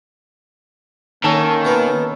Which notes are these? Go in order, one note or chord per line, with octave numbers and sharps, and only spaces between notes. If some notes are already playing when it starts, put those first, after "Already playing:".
D#3 A#3 C#4 A4
B2 B3